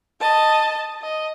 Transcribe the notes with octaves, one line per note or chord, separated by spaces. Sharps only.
D#5 A5
D#5